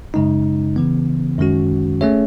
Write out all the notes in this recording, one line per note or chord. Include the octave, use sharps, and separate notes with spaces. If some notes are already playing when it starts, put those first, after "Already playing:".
F#2 C#3 G#3 D#4
C#3 E3 B3
F#2 D#3 G#3 C#4 F#4
A3 C#4 G#4 C#5 E5